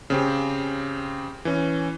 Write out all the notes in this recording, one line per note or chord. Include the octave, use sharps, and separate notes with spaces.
C#3 C4 G4
E3 C#4